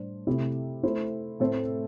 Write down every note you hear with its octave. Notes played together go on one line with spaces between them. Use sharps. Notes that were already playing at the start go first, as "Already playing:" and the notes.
Already playing: A2 G3 D4 C5
C3 A3 E4 G4
A3 E4 C5
A2 A3 C4 A4 C5